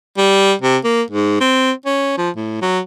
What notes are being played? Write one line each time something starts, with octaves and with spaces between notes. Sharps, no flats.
G3
C3
A#3
G#2
C4
C#4
F3
A2
F#3